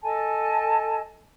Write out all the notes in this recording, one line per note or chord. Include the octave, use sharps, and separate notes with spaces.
A4 D#5 G#5 A5